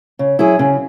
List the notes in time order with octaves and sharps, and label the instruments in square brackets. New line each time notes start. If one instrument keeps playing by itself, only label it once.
[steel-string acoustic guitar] C#3
F#3 E4 G#4
C#3